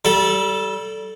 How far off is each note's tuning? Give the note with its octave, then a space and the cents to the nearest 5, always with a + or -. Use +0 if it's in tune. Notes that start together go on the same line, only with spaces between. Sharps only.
G3 -25 A4 -5